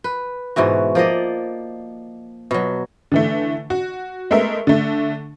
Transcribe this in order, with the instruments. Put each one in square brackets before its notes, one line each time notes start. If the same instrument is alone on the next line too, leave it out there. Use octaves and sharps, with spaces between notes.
[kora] B4
G#2 B2 E3 F#4
F3 A#3 D5 D#5
B2 F#3
[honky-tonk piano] D3 E3 A3
F#4
G#3 A3 B3 A#4 E5
D3 A3